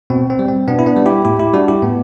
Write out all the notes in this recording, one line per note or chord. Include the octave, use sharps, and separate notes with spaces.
B2 C4
C4
G3
C4
B2 B3 D4
E4
B3 D4
G3
E4 G4
A2 E4 G4
E4 G4
G3 D4 F#4
E4 G4
A2 B3